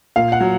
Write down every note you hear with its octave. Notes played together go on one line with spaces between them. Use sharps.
A#2 F5
F#5
F#3